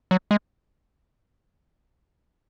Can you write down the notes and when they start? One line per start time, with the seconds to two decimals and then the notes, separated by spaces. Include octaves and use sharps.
0.11 F#3
0.31 G#3